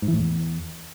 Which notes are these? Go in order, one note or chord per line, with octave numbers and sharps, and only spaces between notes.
G#2
E3
A2
E2